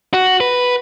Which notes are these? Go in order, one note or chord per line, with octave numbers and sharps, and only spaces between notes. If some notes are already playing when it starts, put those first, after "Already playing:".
F#4
B4